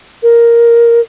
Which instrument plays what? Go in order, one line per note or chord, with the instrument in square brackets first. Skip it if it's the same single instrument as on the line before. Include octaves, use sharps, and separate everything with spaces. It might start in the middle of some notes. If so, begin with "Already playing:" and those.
[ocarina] A#4